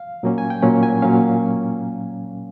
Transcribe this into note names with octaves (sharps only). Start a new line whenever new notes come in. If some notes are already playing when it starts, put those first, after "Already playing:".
Already playing: F5
A#2 F#3 A#3 C#4
G#5
G5
A#2 F#3 A#3 C#4 F#5
G#5
A#2 F#3 A#3 C#4 F5